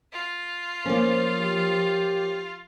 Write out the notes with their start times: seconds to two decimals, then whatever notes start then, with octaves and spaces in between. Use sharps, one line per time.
0.11 F4
0.86 F3 A#3 C#4 C5
1.41 G4